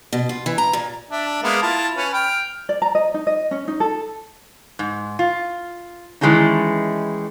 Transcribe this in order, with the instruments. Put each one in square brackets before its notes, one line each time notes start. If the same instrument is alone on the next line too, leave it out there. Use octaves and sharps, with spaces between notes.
[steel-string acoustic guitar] B2
F4
E3
A#5
A#2
[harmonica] D4 E5
G#3 A#3 B3
E4 F4 A5
C#4 B4
G5 F6
[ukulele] D5
A#5
D#5
D#4
D#5
C#4
D#4
A4
[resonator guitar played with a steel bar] G#2
F4
D#3 E3 G#3 A3 C#4 D#4